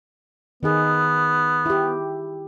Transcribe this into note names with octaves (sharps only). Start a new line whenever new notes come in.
D#3 B3 D#4 G#4
E4 G4